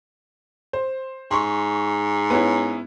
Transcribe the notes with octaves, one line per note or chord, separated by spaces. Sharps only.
C5
G#2 C6 C#6
B3 C#4 E4